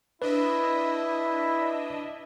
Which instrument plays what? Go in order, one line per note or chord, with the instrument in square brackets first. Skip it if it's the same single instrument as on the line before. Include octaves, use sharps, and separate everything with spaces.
[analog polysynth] D4 D#5 E5 [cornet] E4 [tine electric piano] B4